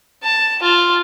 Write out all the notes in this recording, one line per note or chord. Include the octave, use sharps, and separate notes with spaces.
A5
F4